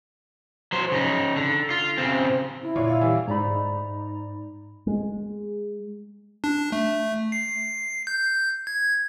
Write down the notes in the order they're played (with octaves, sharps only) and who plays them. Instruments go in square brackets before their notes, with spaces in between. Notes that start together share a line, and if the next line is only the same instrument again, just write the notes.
[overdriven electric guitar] F#3 C5
C#3 D#4
D3
F4
C#3 C4
[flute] E4
[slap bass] A#2 D3 [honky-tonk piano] F4 C#5 D5
[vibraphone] E5 F5 E6
[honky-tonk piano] E3 G3
[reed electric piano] G#2 B5 [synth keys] D#4 D5 A#5
[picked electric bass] G#3
[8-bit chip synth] D4
A3
C7
G6
G#6